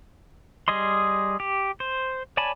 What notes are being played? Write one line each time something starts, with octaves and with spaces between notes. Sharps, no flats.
G3 G#4 D#5 C6
G4
C5
C#5 D5 G#5 A5 B5